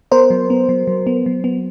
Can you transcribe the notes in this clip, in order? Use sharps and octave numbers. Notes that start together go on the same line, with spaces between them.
B3 A#4 C5
F#3
B3
F#3
F#3
B3
F#3
B3